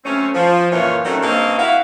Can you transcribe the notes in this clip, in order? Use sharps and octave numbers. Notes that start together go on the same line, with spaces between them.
F#3 A3 C4 C#4
F3
F#2 A#2 E3 C#4 F4 C#5
D#3 F#3 G3 A3 C4 C#4
G2 A#3 C4 C#4 D#5 F5
E4 F#4 F5